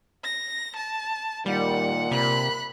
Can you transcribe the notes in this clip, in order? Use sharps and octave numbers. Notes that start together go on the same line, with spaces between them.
A#6
A5
A#2 D#3 G3 F#5
C3 A#4 B5 F#6